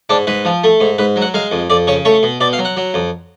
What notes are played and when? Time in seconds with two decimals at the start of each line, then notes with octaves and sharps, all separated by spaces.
0.09 G#2 D4
0.27 G#2 B4
0.45 F3
0.64 A3
0.80 G#2
0.98 G#2 B4
1.16 F#3
1.22 F#5
1.34 G#3 F5
1.51 F2
1.70 F2 D5
1.87 C#3 C#5
2.05 A3 C#5
2.23 B2
2.40 B2 D5
2.53 F5
2.58 F#3
2.65 F#5
2.77 F#3
2.94 F2